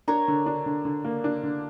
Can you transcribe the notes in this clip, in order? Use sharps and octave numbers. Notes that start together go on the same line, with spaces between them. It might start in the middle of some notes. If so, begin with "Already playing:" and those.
D4 A#4 C#5
D3
D4
D3
D3
A#3
D4
D3